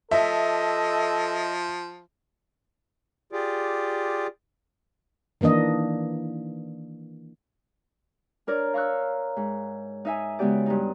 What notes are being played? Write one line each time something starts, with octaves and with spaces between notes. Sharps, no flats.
F3 A4 D#5 E5
F4 G4 G#4 D5
D#3 E3 A#3 D4 D#5
D4 A#4 C#5 D5
F5 A#5 C#6 E6 F#6
G#2
D#4 E5 G#5
C#3 G#3 B3 F#4 G4 D5
G2 D#4